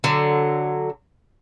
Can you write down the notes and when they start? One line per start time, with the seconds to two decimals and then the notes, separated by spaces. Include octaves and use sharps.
0.04 D3 F#3